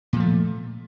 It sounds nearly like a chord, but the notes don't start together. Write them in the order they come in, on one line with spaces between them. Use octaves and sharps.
A#2 F3 A3